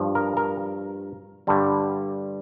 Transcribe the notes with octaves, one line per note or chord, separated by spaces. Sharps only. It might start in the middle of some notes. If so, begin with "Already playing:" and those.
Already playing: G2 F3
A#4
A#4
G2 D3 G3